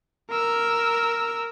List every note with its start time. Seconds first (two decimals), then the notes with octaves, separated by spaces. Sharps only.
0.30 A#4 E6